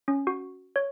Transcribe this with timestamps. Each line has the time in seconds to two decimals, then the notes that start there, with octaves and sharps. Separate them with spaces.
0.08 C#4
0.27 F#4
0.76 C#5